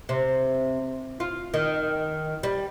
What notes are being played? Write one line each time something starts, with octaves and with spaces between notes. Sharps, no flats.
C3
F4
D#3
G3